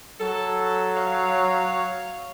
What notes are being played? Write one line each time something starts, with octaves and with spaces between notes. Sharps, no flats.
F#3 A4
C#5 F5